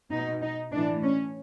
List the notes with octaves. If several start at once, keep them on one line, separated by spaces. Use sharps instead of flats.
B2 D#4
D#4
A2 E3 D4
C#4